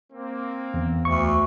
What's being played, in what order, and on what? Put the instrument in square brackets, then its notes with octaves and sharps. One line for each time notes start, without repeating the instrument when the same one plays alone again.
[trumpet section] A#3 C4
[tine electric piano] E2
[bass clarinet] D2 [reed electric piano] C#6